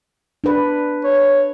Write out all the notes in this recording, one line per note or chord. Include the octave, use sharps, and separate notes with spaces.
D4 B4
C#5